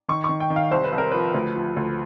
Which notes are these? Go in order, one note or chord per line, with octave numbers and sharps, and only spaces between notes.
D#3 C#6
D#3 C#6
G5
D#3
F5
C2 C5
B4
C2
A#4
F3 B4
D2
F3
D2